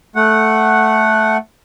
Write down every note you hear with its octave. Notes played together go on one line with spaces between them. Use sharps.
A3 F#5